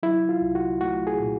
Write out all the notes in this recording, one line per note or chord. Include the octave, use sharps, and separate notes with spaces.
F#3 E4
F4
C2
F#4
A3 F#4
G#4
A#2